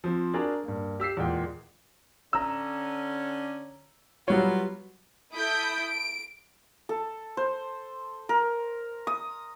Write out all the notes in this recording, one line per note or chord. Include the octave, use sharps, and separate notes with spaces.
F3 C4
D4 F#4 G#4 A#4 D5
G2 A#3
G4 E6 B6 C7
E2 A#2 G#3 G5
D3 C#4 A#5 E6
F#3 G3 B3 F4 F#4 C#5
E4 A4 D#6 G6 B6 D7
D7
A4
C5
A#4
D#6